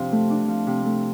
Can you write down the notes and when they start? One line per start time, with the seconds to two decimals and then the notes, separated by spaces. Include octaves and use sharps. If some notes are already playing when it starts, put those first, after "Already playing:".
Already playing: C3 F3 D4
0.12 A3
0.30 D4
0.48 F3
0.67 C3
0.86 A3